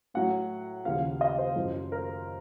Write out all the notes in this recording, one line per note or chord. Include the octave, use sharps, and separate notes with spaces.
A2 F#3 F#5
D#2 C#3 F3 F5
D#5
C5
F#2 F3
A#4